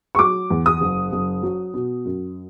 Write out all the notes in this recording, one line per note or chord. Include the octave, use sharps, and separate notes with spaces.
C#6
F#3 D6
E2
D#6
F#1
F#1
F#3
B2
F#2